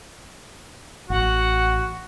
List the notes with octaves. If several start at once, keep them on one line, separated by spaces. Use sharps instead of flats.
A1 F#4 F#5